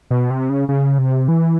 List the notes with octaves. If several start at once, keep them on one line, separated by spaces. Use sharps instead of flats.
B2
C3
C#3
C#3
C3
E3